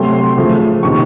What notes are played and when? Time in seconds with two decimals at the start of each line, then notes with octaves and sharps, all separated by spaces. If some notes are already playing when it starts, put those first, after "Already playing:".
Already playing: C3 F#3 A3 C4 C6
0.37 C#3 F3 A3
0.83 C3 D#3 A#3 C#4 C#6